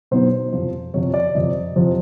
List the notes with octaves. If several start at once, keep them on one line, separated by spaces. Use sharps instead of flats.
B2 F#3 B3 D#4 C5
F2 C3 F3
F2 C3 F3 C#5
D5
F2 C3 F3 D#5
F2 C3 F3